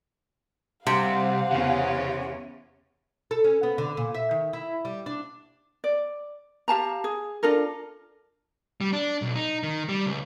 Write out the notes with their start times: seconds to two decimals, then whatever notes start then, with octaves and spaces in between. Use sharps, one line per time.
0.87 C2 C3 F5 F#5
1.51 E2 C#3 C#4
3.31 A4
3.44 C#4
3.63 B3
3.78 D3
3.97 A#2
4.15 E5
4.31 D#3
4.53 E4
4.85 G3
5.06 D4
5.84 D5
6.68 G4 F5 A5 A#5
7.04 G#4
7.43 D4 F4 A4 A#4
8.81 G3
8.93 D4
9.22 B1
9.36 D#4
9.63 D#3
9.89 G3
10.06 C#2